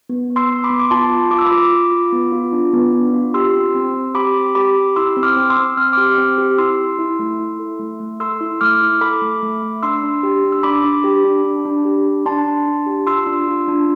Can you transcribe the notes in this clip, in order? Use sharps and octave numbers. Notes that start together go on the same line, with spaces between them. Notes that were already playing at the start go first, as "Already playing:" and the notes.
B3
B3
C6 E6
B3
B5 D6
B3
D6
F4 A5 C6
F4
F4 D6
E6
B5 D6
F4
F4
F4
B3
F4
D4
B3
D4
F4
G4 C6 E6
C4
C4
C4
G4 B5 D6
C4
G4 B5 D6
G4
E4 C6 E6
C4
D6 F6
C4
C6 E6
C4
C4 F6
G4 D6 F6
C4
G4
E4 C6 E6
E4
E4
A3
E4
A4
A3
A3
A4 C6 E6
E4
A3 D6 F6
E4
A4 B5 D6
A3
A3
A3
D4 C6 E6
D4
G4
D4
E6
D4 B5 D6
D4
G4
D4
D4
D4
G4
D4
D4 A5 C6
D4
D4
G4
F4 C6 E6
D4
F4
D4